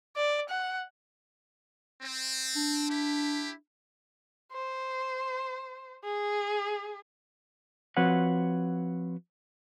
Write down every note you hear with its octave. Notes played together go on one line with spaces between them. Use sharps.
D5
F#5
C4
D4
E4 G4
C5
G#4
F3 C4 F#4 B4 C#5 F#5